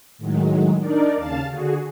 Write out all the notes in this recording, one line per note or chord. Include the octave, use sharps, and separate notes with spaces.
A2 D#3 F#3 G#3
D4 D#4 A#4 D5
D#2 C#3 F5 A5 A6
D3 F#4 G#4